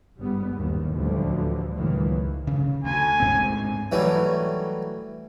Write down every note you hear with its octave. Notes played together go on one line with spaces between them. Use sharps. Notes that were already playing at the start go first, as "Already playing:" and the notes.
G1 G#2 G3 B3
F#1 D#2 A2 D#3
A1 D2 E3 F3 G3
C#2 F#2 A2 D#3 E3 A#3
C#3
D2 G#5
D2 G#2 C4
E3 F#3 G3 A3